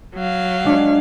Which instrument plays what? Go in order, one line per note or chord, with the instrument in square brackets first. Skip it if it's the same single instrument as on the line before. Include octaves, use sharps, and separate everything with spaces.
[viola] F#3 F5
[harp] G#3 D4